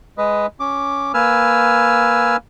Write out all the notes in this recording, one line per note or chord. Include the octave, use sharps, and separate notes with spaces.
G#3 B4 D#5
C#4 D6
A#3 B4 G#5 E6 F6